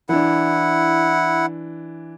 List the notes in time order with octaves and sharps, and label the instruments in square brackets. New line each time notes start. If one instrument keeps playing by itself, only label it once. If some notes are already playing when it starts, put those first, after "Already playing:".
[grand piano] E3 D4 [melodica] E4 F#5